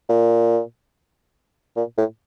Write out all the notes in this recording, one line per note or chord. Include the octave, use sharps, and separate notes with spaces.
A#2
A#2
A2